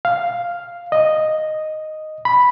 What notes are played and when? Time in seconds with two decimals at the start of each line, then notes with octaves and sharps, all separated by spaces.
0.05 F5
0.92 D#5
2.25 B5